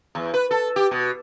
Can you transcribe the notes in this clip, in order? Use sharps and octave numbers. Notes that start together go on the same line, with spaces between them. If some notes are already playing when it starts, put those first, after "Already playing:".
E2
B4
A4
G4
B2